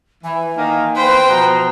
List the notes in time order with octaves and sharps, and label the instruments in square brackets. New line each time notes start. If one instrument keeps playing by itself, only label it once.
[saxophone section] E3 [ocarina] G#5
[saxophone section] D#3 A#3
[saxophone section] E2 B4 [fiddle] C5 G5 [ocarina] C6
[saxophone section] B2 F3 B3 [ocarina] A#5